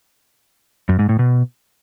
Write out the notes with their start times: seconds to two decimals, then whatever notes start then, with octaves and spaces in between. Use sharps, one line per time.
0.89 F#2
0.99 G#2
1.09 A2
1.19 B2